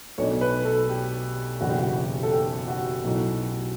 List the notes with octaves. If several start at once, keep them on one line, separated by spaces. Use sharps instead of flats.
B1 B2 A3 D4 C#5
B4
A4
G4
F#1 E2 B2 A3 D4 F#4
G4
F#4
A4
G4
F#4
B1 B2 F#3 A3 E4